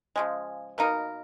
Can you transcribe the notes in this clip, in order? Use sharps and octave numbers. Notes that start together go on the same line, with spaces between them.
C#3 F3 G#3
B2 A#3 D#4 A#4